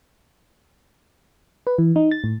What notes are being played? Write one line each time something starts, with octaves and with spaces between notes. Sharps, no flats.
B4
E3
D#4
A6
A2